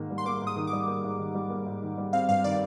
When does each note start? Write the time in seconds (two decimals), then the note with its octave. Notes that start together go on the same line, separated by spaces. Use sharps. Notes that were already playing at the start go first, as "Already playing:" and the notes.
Already playing: G#2 D#3 A#3
0.11 G3
0.18 C6
0.25 A#3 D6
0.42 G#2
0.47 D#6
0.56 D#3
0.67 D6
0.73 G3
0.87 A#3
1.04 G#2
1.19 D#3
1.35 G3
1.50 A#3
1.66 G#2
1.82 D#3
1.98 G3
2.13 C4 F5
2.29 G2 F5
2.44 D#3 D5